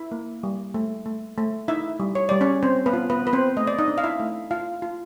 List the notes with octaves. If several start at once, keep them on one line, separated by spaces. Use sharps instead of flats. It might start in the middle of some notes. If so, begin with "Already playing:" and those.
Already playing: E4 E5
A#3
G3
A3
A3
A3
D#4 E4 E5
G3
C#5
G3 D5
C#4 C#5
C4 C5
B3 B4
F4
B3 B4
F4 B4
C4 C5
A3 D#5
D5
D#4 D#5
D4
F5
E4 E5
A3
F4 F5
F4